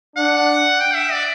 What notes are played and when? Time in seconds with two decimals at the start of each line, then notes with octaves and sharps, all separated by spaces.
0.16 D4 F#5
0.80 G5
0.95 E5
1.12 D5